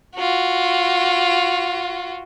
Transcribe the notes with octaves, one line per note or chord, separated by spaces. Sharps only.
F4 F#4